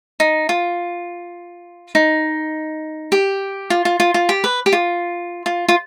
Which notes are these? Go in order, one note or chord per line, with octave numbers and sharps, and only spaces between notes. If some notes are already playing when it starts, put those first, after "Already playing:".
D#4
F4
D#4
G4
F4
F4
F4
F4
G4
B4
G4
F4
F4
F4